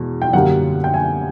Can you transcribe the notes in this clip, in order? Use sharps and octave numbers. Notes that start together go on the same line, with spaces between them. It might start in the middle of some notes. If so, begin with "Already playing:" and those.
Already playing: E2 B2 G#3
G5
F#2 D3 G3 A#3 F#5
G5
G#5